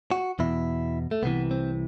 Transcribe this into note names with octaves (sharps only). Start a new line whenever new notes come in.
F#4
E2 B2 E4
A3
C2 C3 E3 B3
C4